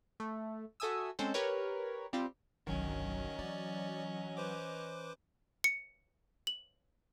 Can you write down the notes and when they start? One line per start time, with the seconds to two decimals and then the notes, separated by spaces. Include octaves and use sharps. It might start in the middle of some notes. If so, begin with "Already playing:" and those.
0.20 A3
0.80 F#4 A4 E5 G#5 D#6 E6
1.19 G#3 C4 C#4 A4 C5
1.34 G4 A#4 B4 C#5
2.13 G3 C4 F4 G4
2.67 G1 C2 D#3 F#3 C#4 D#5
3.39 E3 D5
4.37 B4 C5 D6
5.64 C#7
6.47 F#7